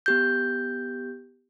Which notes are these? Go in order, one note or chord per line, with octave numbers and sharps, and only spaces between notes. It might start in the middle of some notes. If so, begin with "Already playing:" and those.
B3 G4 G6